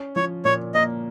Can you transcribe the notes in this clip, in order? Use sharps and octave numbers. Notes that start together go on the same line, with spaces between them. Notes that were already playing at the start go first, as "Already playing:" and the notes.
Already playing: C#4
F3 C#5
A#2 C#5
A#3 D#5